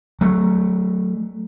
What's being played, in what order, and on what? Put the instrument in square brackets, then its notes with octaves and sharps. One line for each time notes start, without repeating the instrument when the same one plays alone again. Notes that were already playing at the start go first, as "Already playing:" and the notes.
[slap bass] F#3 A3